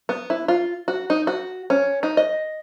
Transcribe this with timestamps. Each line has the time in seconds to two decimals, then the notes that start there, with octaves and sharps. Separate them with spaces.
0.09 B3
0.30 E4
0.48 F4
0.88 F#4
1.10 D#4
1.27 F#4
1.70 C#4
2.03 D#4
2.17 D#5